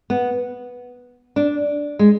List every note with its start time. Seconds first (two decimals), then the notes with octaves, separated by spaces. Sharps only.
0.10 B3
1.36 D4
1.99 G#3